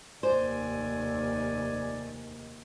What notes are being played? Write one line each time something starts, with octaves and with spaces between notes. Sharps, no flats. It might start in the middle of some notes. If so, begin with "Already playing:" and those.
F1 D#2 C5 D5 G#5